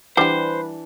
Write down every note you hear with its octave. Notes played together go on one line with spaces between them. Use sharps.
E3 G3 D4 F#4 G4 B4 C5